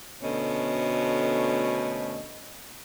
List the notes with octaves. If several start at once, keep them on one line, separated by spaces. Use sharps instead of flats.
D2 B2 D3 A3 C#4 D#5